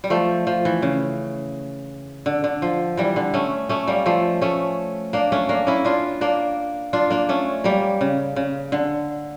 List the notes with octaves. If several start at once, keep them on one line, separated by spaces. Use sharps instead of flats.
G3
F3 A3
F3
E3
C#3
D3
D3
F3
E3 G3
D3
A3 C#4
A3 C#4
G3 A#3
F3 A3
A3 C#4
A#3 D4
A3 C#4
A#3 D4
C#4 E4
D4 F4
A#3 D4
D4 F4
A#3 D4
A3 C#4
G3 A#3
C#3
C#3
D3